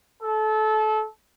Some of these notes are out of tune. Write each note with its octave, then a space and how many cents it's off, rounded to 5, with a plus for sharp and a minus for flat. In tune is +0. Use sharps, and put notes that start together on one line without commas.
A4 -25